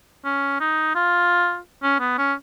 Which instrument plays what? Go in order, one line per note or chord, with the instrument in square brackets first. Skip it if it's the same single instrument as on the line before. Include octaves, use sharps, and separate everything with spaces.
[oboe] C#4
D#4
F4
C#4
B3
C#4